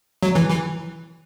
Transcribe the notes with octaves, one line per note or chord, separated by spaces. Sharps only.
F#3
E3
E3